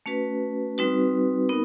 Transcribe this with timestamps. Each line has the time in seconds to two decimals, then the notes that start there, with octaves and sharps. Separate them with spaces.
0.06 A3 C#4 F#4 B4
0.78 G3 C4 D#4 F#4 B4
1.49 B3 D#4 A#4